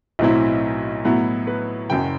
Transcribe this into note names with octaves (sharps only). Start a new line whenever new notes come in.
B1 A2 F#3 C4 E4
A2 F#3 B3 E4
B4
F#1 F#2 F#3 G5